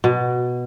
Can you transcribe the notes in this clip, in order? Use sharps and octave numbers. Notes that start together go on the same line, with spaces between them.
B2